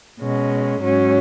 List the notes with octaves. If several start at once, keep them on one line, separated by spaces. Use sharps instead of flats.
B2 G#3 C#4
G#2 F#3 C#4